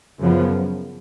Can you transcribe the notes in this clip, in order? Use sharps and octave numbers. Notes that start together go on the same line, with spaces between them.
F#2 C#3 F3 B3